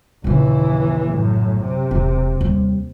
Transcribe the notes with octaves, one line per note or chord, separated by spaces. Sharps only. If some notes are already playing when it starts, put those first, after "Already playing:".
A#1 D#2 C#3 E3
F#2 A2
C3
E1
D#2 G3